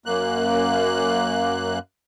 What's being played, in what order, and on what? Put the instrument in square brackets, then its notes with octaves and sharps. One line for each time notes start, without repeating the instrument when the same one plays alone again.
[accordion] F#2 A#3 F#6